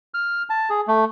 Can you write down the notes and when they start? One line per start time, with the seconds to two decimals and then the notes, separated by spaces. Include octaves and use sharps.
0.14 F6
0.50 A5
0.70 G#4
0.88 A3